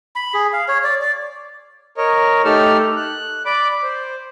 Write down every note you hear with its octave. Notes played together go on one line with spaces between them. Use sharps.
B5
G#4
F5
C#5
D5
D5
A#4 C#5 D#5
A3 D#4 G4 A4 E6 F6
F#6
D5 B5 D6
C5